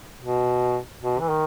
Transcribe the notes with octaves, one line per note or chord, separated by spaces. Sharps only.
B2
B2
E3
D#3